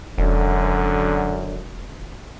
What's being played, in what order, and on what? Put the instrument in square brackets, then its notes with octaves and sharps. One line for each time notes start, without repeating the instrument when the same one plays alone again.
[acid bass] E1 [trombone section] F#2 D3